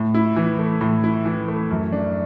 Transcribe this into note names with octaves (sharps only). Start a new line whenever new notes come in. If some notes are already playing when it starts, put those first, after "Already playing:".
Already playing: A2
E4
E3
A3
A2
E4
E3
A3
F#2
D4